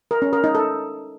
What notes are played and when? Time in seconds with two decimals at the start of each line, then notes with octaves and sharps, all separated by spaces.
0.11 A#4
0.22 C#4
0.33 A#4
0.44 D#4
0.55 A4